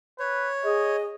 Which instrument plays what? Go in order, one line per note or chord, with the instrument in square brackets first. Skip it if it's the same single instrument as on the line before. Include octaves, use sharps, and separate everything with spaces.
[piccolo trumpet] B4 [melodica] C#5
[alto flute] G#4 [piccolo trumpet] D#5